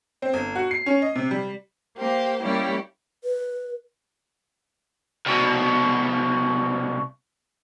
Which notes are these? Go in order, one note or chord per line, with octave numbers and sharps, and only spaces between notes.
C4
G1
F#4
C7
C#4
D#5
C3
G3
A#3 G4 C5
G3 A#3 C#4 E4 G4
B4
C2 B2